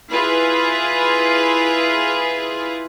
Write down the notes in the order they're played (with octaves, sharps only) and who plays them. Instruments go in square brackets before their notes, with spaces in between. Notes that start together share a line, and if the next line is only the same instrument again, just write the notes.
[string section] E4 F4 G#4 B4